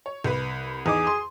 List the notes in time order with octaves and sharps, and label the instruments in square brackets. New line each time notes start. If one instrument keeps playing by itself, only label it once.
[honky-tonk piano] C#5
C2 B4
[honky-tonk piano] E2 D#4 D6 [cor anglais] G#4
[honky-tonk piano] C6